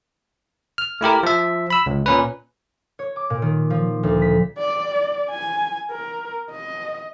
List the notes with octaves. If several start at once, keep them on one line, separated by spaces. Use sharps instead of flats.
F6
A3 E4 G4 A#4
F3 E5
B5 E6
C#2
A#2 C#4 B4
C#5
D6
A#2
D#3
F3
D2
B6
D5
G#5
A#4
D#5